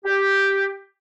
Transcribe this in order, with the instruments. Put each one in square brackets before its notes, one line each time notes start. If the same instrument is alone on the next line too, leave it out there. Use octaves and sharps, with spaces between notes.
[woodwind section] G4